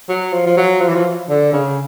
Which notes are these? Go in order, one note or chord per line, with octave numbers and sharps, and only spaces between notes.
F#3
F3
F3
F#3
F3
E3
F3
D3
C#3